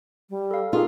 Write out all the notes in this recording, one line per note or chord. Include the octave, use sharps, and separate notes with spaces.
G3
A4 F5
D#4 F4 G4 G#4 A#4